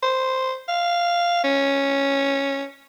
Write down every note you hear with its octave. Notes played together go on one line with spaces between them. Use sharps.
C5
F5
C#4